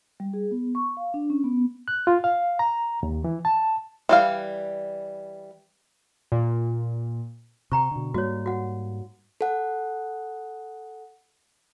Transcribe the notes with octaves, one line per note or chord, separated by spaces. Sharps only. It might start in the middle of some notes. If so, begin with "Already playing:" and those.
G3
G#4
B3
C#6
F5
D4
C#4
B3
F#6
F4
F5
A#5
D#2
E3
A5
E3 G3 F5
A#2
C3 G5 A#5 C#6
B2 D3
G#2 G3 A#3 F#4 C#5
F#4 F#5
A4 F#5